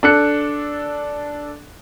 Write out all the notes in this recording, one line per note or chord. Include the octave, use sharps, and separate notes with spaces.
D4 A4 F#6 C#7